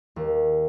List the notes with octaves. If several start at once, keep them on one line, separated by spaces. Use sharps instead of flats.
D#2